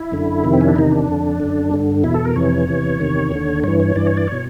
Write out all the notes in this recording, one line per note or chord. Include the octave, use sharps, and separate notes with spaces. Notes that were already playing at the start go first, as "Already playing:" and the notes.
Already playing: E4
F#2 D3
F2 C3 D#3
C4
C#4
D4
E2 C3 D#3 D#4
D4
F2 D3
F#2 D3
G2 D3
E2 B2 E4
A4
A#4
F2 C3 E3 C#5
E2 C3 E3
E2 C3 D#3
D#2 D3
G2 E3 C#5
C#5
G2 E3 D5
C#5
D5
B2 C#5